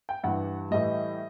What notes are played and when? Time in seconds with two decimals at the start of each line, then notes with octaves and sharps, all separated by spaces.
0.09 G5
0.24 G2 E3 G3 F#5
0.71 A2 E3 G3 D#5